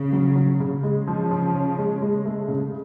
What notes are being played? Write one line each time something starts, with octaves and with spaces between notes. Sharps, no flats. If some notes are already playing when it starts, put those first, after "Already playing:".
Already playing: C#3
F#3
F#3
C#3
C#3 G#3
F3
F3
C#4
G#3
G#3
A3
C#3